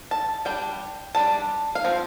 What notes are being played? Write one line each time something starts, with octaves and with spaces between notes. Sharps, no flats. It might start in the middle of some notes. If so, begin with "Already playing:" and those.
A5
G3 D4 G5
G3 D4 A5
F5
F3 C4